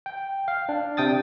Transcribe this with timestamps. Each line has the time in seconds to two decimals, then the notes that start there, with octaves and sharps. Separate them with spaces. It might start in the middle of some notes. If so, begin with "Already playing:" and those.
0.06 G5
0.48 F5
0.69 D4
0.97 C3 G5 D#6 A6